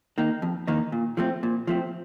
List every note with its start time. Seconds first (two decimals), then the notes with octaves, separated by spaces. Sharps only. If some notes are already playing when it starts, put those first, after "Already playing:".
0.18 D#3 A#3 D#4
0.42 F2
0.67 D#3 A#3 D#4
0.92 A#2
1.17 F3 A3 C4
1.43 A#2
1.67 F3 A3 C4